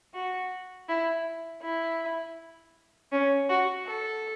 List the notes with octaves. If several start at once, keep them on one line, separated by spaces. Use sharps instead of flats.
F#4
E4
E4
C#4
F#4
A4